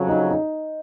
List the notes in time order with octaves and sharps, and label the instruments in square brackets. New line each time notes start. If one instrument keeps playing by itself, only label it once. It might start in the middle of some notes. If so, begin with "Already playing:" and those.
Already playing: [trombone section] F2 C#3 F#3
[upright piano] D#4
D#4